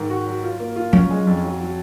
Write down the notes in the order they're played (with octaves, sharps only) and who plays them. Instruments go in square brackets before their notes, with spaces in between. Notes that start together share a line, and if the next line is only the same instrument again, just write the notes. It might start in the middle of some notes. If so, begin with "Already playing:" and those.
Already playing: [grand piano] G#2 D#3
F#4
F#3
F4
A#3
F4
[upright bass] F#3 [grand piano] C#4
[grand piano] G#3
F2
F#3
F#3